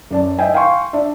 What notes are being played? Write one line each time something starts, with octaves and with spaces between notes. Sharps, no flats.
F#2 D5 A5
D#5 E5 G5 G#5
F5 G5 G#5 C6 C#6
D4 D5 E5